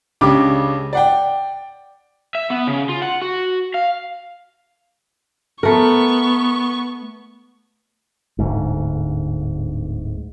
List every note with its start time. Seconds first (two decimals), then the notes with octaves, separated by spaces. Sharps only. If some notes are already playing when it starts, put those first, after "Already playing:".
0.21 C#2 C#3 D4 G4 D6
0.93 D5 F#5 G5
2.35 E5
2.50 B3
2.67 C#3
2.89 F4
3.02 F#5
3.22 F#4
3.74 F5
5.63 A3 B3 A#4 C#6
8.39 D1 D2 G#2